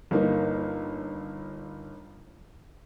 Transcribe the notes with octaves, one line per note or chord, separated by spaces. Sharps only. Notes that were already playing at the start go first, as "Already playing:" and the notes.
G1 A#3 D#4